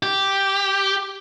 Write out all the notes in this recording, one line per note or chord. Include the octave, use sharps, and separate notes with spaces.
G4